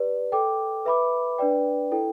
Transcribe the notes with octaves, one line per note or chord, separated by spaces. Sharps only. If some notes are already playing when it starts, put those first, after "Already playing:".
Already playing: G4 B4 D5
A4 G5 D6
B4 E5 B5 D6
D4 B4 D5 G5
E4 A4 G5